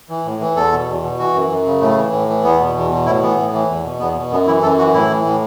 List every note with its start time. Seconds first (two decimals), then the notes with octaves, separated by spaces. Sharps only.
0.09 E3
0.25 A2
0.41 E3
0.56 E2 A4
0.72 B2
0.88 E2
1.03 B2
1.18 E3 F#4
1.34 F#2
1.50 F#2
1.66 C#3
1.81 A2 A3
1.97 E3
2.12 A2
2.28 E3
2.43 E2 B3
2.59 B2
2.75 E2
2.91 B2
3.06 A2 E4
3.22 E3 B3
3.37 A2
3.53 E3
3.69 E2
3.84 B2
3.99 E2 B3
4.16 B2
4.31 F#2 B3
4.47 E3 E4
4.62 F#2 A4
4.78 E3 F#4
4.93 A2 E4
5.10 E3
5.25 A2